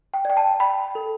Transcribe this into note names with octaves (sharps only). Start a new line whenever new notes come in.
G5
D5 G5
A5
G5 B5
A4